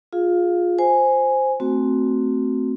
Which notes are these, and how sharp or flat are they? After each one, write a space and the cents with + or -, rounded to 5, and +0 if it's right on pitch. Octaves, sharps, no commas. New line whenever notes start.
F4 +15 G#4 +0 F5 +0
C5 +0 G#5 +0
A3 +25 C4 +0 F#4 +0